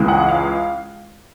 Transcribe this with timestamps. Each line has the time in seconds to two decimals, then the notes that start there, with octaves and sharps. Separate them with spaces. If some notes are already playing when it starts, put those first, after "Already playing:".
Already playing: C#2 C#3 E3 G#3
0.08 F#5
0.29 F5